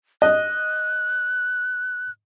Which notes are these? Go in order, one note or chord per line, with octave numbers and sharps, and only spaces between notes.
D#5 F#6